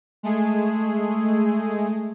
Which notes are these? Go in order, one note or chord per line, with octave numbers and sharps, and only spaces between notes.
G#3 A3 G#4